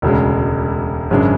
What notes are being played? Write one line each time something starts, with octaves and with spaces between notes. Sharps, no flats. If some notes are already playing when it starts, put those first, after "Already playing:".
E1 D2 C#3 G#3
G#1 F#2 C#3 G#3 D4